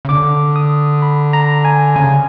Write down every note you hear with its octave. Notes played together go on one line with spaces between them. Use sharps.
C#3
D3 D6
D#6
B5
A#5
G#5
C#3 G#5